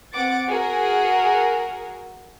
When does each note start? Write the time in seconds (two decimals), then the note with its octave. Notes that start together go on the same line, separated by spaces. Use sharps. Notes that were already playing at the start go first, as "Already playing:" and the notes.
0.13 C4 F#5 D6 A6
0.47 F#4 G#4 A#4